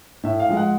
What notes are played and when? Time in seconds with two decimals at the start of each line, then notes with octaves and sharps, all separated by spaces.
0.23 A2 E5
0.40 F5
0.48 F3 G#3
0.57 F#5